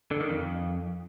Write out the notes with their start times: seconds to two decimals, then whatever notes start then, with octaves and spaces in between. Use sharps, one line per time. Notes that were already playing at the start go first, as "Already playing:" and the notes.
0.11 D3
0.20 D#3
0.30 F2